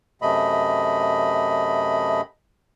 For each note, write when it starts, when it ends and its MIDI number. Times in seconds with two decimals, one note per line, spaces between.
0.22 2.21 42
0.22 2.21 48
0.22 2.21 57
0.22 2.21 75
0.22 2.21 83